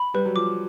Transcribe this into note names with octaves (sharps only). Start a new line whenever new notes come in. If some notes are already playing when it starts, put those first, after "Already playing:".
Already playing: B5
G3 B4
F#3
F3 D6